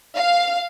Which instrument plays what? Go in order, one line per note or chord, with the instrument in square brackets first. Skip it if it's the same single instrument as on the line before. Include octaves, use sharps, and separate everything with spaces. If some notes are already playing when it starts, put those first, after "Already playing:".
[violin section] F5